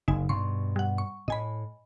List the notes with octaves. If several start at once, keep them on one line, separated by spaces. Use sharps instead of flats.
F#1 D#4 G#5
G2 B2 C6 C#6
G3 F#5
C#6
A2 D#5 G#5 B5